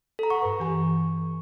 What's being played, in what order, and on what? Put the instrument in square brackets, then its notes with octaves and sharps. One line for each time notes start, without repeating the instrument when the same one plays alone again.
[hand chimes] A4 A#5
[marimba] F#5 [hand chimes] C#6
[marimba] G2 B4
E3 G4 G#5